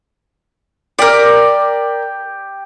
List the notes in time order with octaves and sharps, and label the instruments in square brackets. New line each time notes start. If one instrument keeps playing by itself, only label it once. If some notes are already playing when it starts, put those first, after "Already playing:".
[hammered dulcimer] G4 [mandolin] A#4 D5